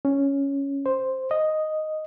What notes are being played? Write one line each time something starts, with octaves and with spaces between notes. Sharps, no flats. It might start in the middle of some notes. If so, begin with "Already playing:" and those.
C#4
C5
D#5